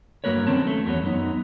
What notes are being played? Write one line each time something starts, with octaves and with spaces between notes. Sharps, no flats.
G2 F#3 A#3 A#4 B4 C#5
D#3 C4 C#4 A5
A3
E2 E3 F#3 B3 C#5
F#2 B3 D#4